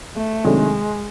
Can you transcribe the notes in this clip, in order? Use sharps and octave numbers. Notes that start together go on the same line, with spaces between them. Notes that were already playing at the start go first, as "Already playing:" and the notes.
A3
C3 D#3 F#3 G#3 A3 D4